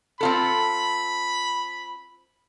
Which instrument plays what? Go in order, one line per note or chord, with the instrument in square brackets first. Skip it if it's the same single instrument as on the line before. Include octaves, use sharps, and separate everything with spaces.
[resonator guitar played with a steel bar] C4 F4 A4 [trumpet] B5